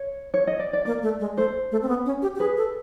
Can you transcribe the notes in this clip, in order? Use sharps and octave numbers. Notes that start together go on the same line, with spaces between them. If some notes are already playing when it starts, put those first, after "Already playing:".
Already playing: C#5
C#5
D#5
D5
D5
A#3 D5
A3
G#3
A3 C5
A3
C4
B3
C#4
G4
G4
G#4 B4
A4